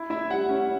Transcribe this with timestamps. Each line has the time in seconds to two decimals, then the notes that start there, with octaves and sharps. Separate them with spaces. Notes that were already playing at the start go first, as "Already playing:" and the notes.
Already playing: E4
0.10 E4 E5
0.30 G3 F#5
0.49 C#4